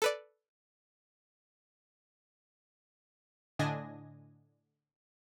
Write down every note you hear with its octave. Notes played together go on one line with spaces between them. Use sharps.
A4 B4 D5
A2 D3 D4 D#5 G#5 A#6